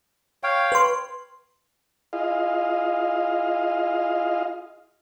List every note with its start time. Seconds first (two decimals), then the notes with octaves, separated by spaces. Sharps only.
0.43 C#5 F5 G5
0.72 B4 C6
2.13 E4 F4 G#4 D#5 F5